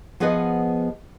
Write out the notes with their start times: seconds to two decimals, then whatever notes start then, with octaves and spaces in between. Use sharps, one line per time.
0.20 F3 B3 G#4 B4 D#5 F#5